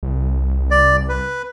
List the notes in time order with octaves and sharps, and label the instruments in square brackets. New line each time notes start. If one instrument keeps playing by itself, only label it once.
[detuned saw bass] C2
[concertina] D5
B4